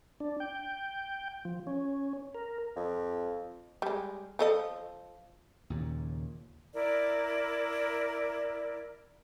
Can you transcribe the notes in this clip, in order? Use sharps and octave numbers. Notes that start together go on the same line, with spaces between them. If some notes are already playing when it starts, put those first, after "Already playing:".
D4
G5
F3
C#4
A#4
F2
G3 G#3
F3 A4 D#5
D#2 A#2 C#3
E4 A#4 D5